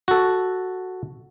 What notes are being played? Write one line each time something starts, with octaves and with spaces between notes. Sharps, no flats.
F#4 A4